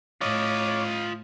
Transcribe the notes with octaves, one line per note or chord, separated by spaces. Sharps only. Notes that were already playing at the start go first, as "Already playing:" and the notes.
A2 F4 C#5 D#5 D6